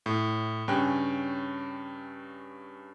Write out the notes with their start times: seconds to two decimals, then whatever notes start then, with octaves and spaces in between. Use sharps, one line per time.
0.06 A2
0.68 G2 C#3 C#4 G5 G#5 F#6